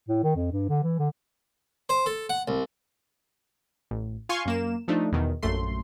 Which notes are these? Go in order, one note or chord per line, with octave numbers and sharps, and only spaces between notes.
A2
D#3
F2
G2
D3
E3
D3
C5
A4
F#5
C2
A1
F4 F5 G#5 C6 C#6
F#2 A#3 E7
F3 A3 D4 D#4
E2 B2 D#3
A#1 F#2 A3 C6